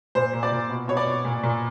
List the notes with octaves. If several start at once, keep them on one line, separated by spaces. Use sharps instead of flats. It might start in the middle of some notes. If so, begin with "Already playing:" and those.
A#2 C5
A#2
D5
A#2
B2
B2 C#5
D5
B2
A#2
A#2